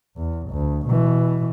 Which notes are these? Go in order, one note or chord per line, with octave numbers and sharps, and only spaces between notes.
E2
D2
B2 E3